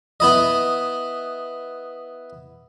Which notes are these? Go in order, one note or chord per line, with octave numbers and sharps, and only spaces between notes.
B3 E4 D#5